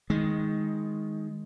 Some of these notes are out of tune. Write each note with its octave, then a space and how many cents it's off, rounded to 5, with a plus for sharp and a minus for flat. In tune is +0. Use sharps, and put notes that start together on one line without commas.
D#3 +15 G#3 +0